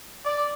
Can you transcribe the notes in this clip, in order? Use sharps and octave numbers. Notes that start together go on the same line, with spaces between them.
D5